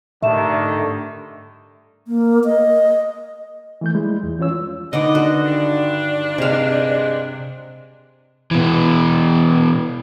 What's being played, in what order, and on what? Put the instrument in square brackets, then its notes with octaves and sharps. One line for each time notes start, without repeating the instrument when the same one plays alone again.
[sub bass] G#2 [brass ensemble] D3 D#3 G3 [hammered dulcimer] A3 [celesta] E5 E7
[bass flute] A#3
D#5
[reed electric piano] E3 A3 G6
G3 G#3 E4
E2
E3 C#4 F4 C#5 E6
[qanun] D3 D#3 D5 [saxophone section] B3 B4 D#5
[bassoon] D3 [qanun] F#4
[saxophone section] G2 D4
[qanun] C3 F5 [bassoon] G#3
[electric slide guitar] B2 E3